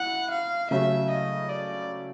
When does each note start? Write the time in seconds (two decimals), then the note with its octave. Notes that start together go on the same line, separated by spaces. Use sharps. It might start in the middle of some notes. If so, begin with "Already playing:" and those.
Already playing: E4 F#5
0.31 F5
0.71 C#3 F#3 A3 C#4 E5
1.10 D#5
1.49 D5